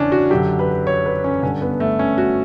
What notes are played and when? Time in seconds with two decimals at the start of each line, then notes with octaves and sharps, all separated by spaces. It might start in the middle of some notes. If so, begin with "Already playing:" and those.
Already playing: E2 C#3 E3 C#4 D4
0.12 F#4
0.30 F#2 G4
0.35 D3
0.59 B4
0.87 C#5
1.06 B4
1.24 C#4
1.43 G2 D3 C#4
1.62 B3
1.80 A3
1.99 C#4
2.18 F#4